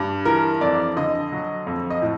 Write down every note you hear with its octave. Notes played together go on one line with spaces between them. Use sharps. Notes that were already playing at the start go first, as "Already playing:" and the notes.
Already playing: G2
E3 A#4
F2 D5
D3 D#5
F#3
F2
D#5
A2